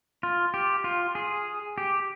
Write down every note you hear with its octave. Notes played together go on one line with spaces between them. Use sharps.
F4
G4
F4
G#4
G4